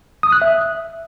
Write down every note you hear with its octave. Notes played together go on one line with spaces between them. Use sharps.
D#6
F#6
E5